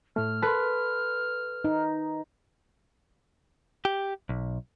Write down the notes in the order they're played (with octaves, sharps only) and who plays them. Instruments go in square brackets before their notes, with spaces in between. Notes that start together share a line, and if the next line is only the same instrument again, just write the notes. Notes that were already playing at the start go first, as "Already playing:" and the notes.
[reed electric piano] A2 A3 [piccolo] F6
[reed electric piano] A4 C6 [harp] B4
[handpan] D#4
[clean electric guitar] G4
B1